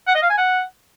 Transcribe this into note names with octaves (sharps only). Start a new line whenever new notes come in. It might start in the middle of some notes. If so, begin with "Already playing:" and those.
F#5
D#5
F5
G#5
F#5